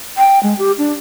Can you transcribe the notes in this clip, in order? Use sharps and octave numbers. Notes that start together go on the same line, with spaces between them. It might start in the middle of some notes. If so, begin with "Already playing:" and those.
G5
G#3
G4
D4